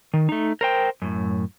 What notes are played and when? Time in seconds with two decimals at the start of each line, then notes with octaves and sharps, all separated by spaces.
0.14 D#3
0.29 A3 D#4
0.61 A#4 C5 G5
1.02 F#2 A2